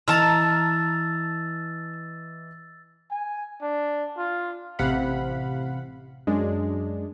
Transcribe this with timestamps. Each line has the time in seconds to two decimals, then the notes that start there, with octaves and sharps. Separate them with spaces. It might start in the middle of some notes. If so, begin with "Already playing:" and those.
0.08 E3 D#5 A5 A#5 E6 F6 A6
3.11 G#5
3.62 D4
4.18 F4
4.79 A1 C3 F5 F#5 B5
6.27 F#2 G#3 D4